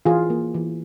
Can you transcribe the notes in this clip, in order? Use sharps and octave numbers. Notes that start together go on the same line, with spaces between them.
E3 F4 G#4
A#3
E3